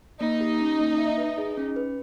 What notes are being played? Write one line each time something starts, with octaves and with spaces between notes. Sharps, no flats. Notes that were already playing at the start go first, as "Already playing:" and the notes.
A#3 D#4
G4
C#4
A#3
E5
B4
G#4
C#4
B4